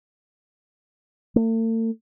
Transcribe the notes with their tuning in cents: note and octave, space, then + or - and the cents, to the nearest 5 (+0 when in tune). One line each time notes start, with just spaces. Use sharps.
A3 +45